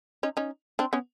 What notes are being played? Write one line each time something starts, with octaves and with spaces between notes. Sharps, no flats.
C#4 D#4
C#4 D#4
C4 D4
B3 C#4